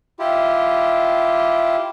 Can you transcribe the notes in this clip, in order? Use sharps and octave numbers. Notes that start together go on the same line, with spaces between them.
E4 F4 G4